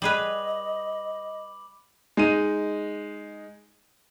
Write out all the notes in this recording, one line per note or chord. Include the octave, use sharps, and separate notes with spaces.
G3 G#4 B4 D#5 B5 D6 F#7
G#3 D#4 D#7